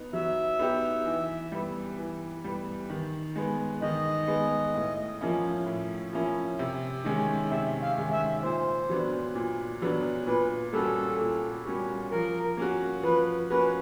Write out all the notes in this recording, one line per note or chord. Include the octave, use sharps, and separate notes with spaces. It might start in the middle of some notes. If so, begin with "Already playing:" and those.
Already playing: B3 D#4
F#3 E5
B3 D#4 G4
E3
G3 B3
E3
G3 B3
D#3
G#3 B3
D#3 D#5
G#3 B3
A2
F3 A#3 C#4 E4
A2
F3 A#3 C#4 E4
C3
D#3 G#3 C#4
C3 E5
F5
D#3 G#3 C#4
E5
A#2 C5
F#3 B3 D4
A#2
F#3 B3 D4
A#2 B4
G3 A#3 C#4 F#4 A4
A#2
G3 A#3 C#4 F#4
F3 A#4
A#3 C#4 F#4
F3 B4
A#3 C#4 F#4 B4